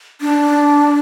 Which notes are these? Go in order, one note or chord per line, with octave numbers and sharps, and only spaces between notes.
D4